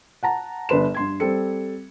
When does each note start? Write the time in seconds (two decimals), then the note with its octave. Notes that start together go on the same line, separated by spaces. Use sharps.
0.23 F#5 A5 A#5
0.69 G1 D4 B4 C6 E7
0.94 G2 C6 G#6
1.20 G3 C4 A4 C#7